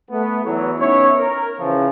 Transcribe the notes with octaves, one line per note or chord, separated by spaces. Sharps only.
A3 B3
E2 E3 F#3
B3 C#4 D#4 E4 C#5
A#4
C#3 E3 F3